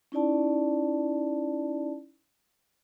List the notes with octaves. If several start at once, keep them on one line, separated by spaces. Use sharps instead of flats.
C#4 D#4 E4 D5 A5